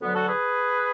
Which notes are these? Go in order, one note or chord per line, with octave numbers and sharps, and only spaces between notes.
D2 D3 F#3 B3
F#4 A4
G#4 B4